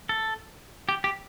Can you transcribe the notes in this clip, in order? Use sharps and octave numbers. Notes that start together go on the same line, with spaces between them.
A4
G4
G4